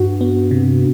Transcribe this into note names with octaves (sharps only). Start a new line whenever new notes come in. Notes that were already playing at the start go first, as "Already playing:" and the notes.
Already playing: G2 F#4
B3
C3